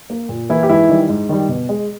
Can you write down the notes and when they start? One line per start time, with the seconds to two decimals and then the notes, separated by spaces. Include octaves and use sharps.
0.10 A#3
0.29 A#2
0.49 E3 A#3 E4
0.63 G4
0.69 G#2 E3 E4
0.89 D#3 G3
1.09 G#2
1.29 D#3 G3
1.49 B2
1.69 G#3